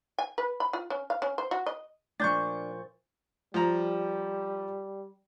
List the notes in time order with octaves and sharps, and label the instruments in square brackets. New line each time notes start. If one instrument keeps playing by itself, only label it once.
[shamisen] G#5
B4
B5
F4
C#4
F5
C#4
C5
F#4
D#5
[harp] A#2 F3 A#3 [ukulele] D4 [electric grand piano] C#6 G6 A6
[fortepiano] F3 A#5 [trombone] G3